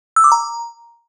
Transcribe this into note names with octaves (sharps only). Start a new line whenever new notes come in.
E6
D6
A#5